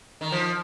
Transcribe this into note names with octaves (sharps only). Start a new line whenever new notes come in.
D#3
F3